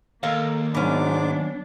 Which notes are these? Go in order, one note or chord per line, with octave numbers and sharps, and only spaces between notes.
D#2 A#3 A4 A#4 F5
G#2 F#3 B3 C#4 D4 D6